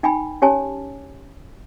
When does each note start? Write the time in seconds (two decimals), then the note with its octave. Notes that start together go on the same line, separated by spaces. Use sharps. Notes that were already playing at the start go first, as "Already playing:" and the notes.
0.03 D#4 G5 G#5 B5
0.42 C#4 G4 C#5 G#5 A5